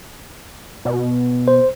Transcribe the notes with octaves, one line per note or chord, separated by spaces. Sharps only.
B2
C5